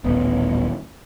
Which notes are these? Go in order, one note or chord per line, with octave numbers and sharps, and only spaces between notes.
D#1 A1 A2 B3